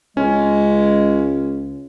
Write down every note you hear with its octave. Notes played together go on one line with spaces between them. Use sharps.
C#2 G#3 C#4